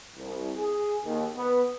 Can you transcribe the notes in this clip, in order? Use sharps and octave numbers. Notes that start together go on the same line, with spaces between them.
C2
G#4
D#2
B3